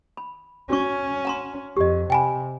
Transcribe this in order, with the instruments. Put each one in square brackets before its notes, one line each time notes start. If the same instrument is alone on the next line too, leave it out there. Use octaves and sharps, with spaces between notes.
[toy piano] B5
[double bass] C#4 [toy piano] F#4 C#6
[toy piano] F#5 A#5 C6
[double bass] F2 [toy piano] G4 D#5
[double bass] C3 [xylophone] G5 G#5 B5